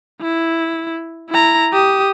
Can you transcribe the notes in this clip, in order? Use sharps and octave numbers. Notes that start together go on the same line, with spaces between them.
E4
E4 A#5
G4 D#6